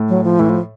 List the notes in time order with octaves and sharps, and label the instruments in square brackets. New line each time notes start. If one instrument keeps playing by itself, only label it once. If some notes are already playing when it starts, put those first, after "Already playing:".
Already playing: [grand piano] A2
[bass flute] F#3
F3
[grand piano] A2 [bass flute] E3
[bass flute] F3